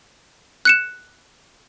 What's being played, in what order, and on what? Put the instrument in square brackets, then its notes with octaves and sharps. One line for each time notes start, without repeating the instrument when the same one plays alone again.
[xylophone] F#6 C#7 E7